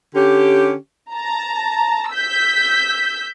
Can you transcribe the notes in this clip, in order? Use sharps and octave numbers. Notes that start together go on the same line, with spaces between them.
D3 C#4 G4
A5 A#5
E6 G6 B6